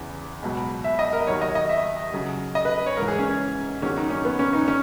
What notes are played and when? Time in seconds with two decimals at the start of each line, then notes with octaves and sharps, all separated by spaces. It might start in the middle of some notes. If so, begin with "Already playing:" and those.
Already playing: E2 C#3 E3
0.42 C#2 B2 F#3
0.84 E5
0.99 D#5
1.13 A#4
1.27 D#2 D#3 F#3 C#5
1.41 D#5
1.55 D#5
1.69 E5
2.13 F#2 C#3 F#3
2.55 D#5
2.65 B4
2.86 C#5
2.97 G#2 A#4
3.02 E3
3.08 G#4
3.19 C#4
3.29 C#4
3.82 E2 D#3 F#3 C#4
3.97 D#4
4.10 C#4
4.25 B3
4.39 C#4
4.53 D#4
4.68 C#4